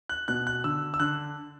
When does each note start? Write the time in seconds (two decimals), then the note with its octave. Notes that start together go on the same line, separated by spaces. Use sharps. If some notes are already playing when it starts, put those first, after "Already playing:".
0.09 F#6
0.28 B2 F#6
0.47 F#6
0.64 D3 E6
0.94 E6
1.00 D3 F#6